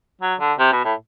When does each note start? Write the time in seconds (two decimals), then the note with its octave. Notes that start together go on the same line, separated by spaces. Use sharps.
0.22 F#3
0.40 D3
0.59 C3
0.72 B2
0.85 A2